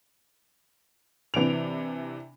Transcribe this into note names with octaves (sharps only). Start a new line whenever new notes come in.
C3 E3 D4 D7 F7